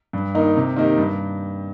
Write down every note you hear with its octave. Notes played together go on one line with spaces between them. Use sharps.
G2
D#3 A#3 D#4
C3
D#3 A#3 D#4 G4
G2